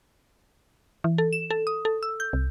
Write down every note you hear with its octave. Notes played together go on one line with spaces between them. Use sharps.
E3
A4
E7
A4
D#6
A4
E6
G6
C2